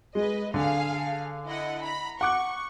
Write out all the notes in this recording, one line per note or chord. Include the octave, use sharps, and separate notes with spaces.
G#3 B4 D#5
D3 G#4 F5
E4 D#5 F#5
A#5 B5
F#5 C#6 D6 F#6